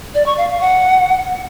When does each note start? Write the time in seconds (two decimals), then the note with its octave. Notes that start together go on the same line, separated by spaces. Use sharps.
0.15 D5
0.26 C#6
0.38 F5
0.49 F5
0.61 F#5